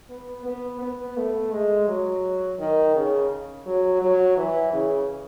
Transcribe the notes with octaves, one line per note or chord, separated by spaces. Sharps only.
B3
B3
B3
A3
G#3
F#3
D#3
C#3
F#3
F#3
E3
C#3